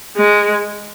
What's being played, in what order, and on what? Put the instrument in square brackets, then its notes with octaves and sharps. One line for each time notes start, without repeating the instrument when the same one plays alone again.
[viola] G#3